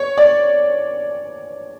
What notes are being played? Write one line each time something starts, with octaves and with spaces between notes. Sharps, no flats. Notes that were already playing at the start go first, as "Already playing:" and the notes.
Already playing: C#5
D5